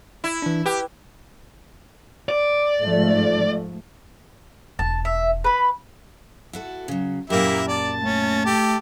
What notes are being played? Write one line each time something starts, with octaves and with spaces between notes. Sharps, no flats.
E4
E3 D4
G4 B4
D5
G#2 F3 A3
E1 A5
E5
B4 B5
E4 F#4 A4
C#3 F#3
F#2 A#2 A#3 E4 G4 A#4 E5
D5 A5 A6
A3 C#4
G4 A4